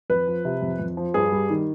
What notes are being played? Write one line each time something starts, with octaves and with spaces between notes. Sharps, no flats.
F2 B4
F3
C3
F2
F2
F3
G2 G#4
G3
D#3